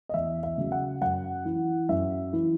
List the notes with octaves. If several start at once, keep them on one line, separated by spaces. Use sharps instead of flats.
D#5
E2 E5
E5
C#3 F#3
F#5
F#2 F#5
E3
F#2 E5
E3